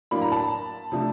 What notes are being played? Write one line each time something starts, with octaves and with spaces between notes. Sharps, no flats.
A2 F#3 A#3 D4 B5
A#5
A5 B5
C3 F3 A3 D4